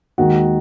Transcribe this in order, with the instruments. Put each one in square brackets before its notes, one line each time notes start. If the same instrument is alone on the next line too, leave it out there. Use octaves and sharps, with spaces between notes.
[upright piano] D#2 D#3 G#3 F#4